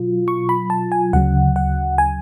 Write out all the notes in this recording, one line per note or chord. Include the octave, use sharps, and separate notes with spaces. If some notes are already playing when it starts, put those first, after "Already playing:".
Already playing: B2 F#3 F4
C#6
B5
A5
G#5
D2 C#3 F#3 F#5
F#5
G#5